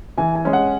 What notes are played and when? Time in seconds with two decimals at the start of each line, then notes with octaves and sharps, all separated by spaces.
0.18 E3 G#5
0.35 G#5
0.45 G#3 C#4
0.53 F#5